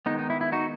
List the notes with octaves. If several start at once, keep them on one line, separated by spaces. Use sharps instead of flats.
D#3 G#3 B3 D#4
D#4
E4
E4
D#4 F#4